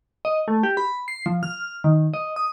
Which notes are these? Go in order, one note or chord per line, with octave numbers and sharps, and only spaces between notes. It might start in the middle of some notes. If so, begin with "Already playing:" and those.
D#5
A3
G4
B5
C7
F3
F6
D#3
D#5
D#6